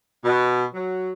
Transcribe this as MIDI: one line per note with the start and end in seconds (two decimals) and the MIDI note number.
0.24 0.64 47
0.74 1.13 54